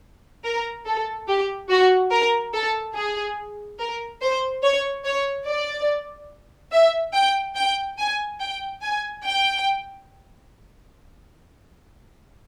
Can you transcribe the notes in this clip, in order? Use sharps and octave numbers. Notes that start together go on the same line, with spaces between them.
A#4
A4
G4
F#4
A#4
A4
G#4
A#4
C5
C#5
C#5
D5
E5
G5
G5
G#5
G5
G#5
G5